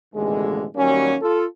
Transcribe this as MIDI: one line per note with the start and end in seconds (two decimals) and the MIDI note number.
0.15 0.64 33
0.15 0.64 39
0.15 0.64 47
0.15 0.64 50
0.15 0.64 56
0.76 1.16 39
0.76 1.16 54
0.76 1.16 55
0.76 1.16 58
0.76 1.16 61
1.22 1.45 65
1.22 1.45 69